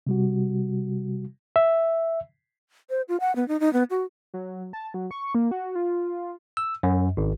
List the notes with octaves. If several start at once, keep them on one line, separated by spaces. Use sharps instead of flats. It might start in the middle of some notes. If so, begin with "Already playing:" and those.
C3 G3 F#4
E5
C5
F4
F#5
B3
D#4
D#4
B3
F#4
F#3
A5
F#3
C#6
A#3
F#4
F4
E6
F#2
G#1